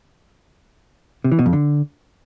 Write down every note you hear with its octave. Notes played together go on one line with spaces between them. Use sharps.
C3
E3
B2
F2
D3